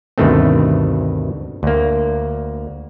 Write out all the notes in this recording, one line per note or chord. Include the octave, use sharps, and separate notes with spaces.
D2 G2 B2 D#3 A3 C4
D2 A#3